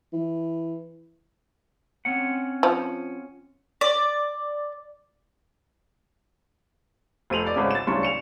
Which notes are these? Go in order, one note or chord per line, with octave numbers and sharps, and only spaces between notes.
E3
C4 C#4 F#5
F3
D5
F1 C5 D#7 F7 F#7
B4 D5
G#1 C#3 D6
A6 E7
D1 C2 C#3 D4 C6 C#6
C#7 E7 F7